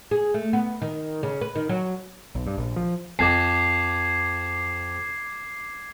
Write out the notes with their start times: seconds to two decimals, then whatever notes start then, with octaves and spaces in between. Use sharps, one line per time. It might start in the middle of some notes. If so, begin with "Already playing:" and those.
0.11 G#4
0.34 A3
0.53 B3
0.82 D#3
1.23 C#3
1.41 B4
1.55 D#3
1.69 F#3
2.35 B1
2.46 G2
2.58 A#1
2.76 F3
3.19 F2 D6 G#6 C7